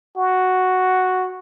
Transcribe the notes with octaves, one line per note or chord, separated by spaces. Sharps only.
F#4